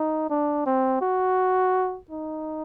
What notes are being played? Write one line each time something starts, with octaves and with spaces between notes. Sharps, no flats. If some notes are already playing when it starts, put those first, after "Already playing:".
Already playing: D#4
D4
C4
F#4
D#4